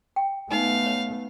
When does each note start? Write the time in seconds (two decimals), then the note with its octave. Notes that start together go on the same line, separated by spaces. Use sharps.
0.16 G5
0.51 A3 B3 D#4 F5 G#5
0.86 C#5